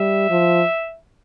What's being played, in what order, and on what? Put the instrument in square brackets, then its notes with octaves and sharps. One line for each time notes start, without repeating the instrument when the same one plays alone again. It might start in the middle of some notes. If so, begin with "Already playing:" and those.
Already playing: [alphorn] G3 [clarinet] E5
[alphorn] F3